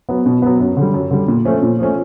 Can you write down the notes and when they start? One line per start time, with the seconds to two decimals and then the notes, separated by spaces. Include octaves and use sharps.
0.09 F#3 B3
0.26 B2
0.42 F#3 B3
0.60 F#2
0.77 D3 G3
0.94 F#2
1.11 D3 G3
1.28 A#2
1.45 F3 A3 C#4
1.62 A#2
1.79 F3 A3 C#4